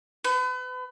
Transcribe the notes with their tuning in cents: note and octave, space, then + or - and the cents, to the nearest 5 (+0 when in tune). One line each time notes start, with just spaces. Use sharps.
B4 +35